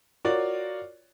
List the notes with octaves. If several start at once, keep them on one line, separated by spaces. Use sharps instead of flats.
F4 F#4 A#4 C#5 D5